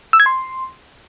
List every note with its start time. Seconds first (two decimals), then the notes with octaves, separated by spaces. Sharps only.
0.13 E6
0.20 G#6
0.26 C6